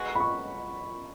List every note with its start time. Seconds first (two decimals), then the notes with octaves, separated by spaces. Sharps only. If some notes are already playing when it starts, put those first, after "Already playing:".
Already playing: G#3 B3 F#4
0.15 B5
0.20 C#6